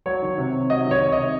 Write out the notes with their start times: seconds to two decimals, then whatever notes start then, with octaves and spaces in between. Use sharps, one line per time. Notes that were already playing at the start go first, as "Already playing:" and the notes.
0.06 F#3 C#5
0.22 D#3
0.38 C3
0.54 C3
0.70 F#3 D#5
0.86 D#3
0.91 C#5
1.02 C3
1.12 D#5
1.18 C3